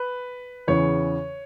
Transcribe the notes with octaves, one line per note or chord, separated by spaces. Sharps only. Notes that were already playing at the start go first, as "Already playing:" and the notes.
Already playing: B4
E2 C#3 E3 C#5